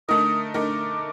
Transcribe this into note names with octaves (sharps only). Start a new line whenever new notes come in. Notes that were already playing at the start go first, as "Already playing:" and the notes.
D3 A3 D#4 A#4 D#6
D3 A3 D#4 A#4 D6